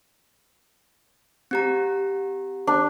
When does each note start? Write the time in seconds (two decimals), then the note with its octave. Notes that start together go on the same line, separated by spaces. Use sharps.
1.51 C4 G4 A#5
2.67 D4